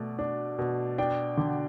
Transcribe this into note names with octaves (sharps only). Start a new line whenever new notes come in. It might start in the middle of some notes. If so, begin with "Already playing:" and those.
Already playing: B2 A3 D5
D4
B2
D4 G5
D3